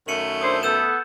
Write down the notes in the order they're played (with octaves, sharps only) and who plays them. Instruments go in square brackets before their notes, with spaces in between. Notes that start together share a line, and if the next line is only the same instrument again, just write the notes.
[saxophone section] F#2 D#3 A3 [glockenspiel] C#7 D#7 F#7
[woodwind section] D4 E4 C5 [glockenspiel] D#6
[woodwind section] B3 A4 [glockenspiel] E6 G6 E7